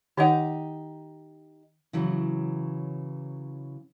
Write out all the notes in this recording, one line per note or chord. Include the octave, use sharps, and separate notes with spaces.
D#3 D#4 G4 C#5 F#5
C#3 E3 F#3